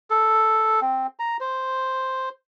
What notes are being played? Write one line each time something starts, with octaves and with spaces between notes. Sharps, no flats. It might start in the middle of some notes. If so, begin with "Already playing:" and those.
A4
C4
A#5
C5